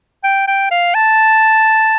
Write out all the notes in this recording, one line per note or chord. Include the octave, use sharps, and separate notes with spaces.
G5
G5
F5
A5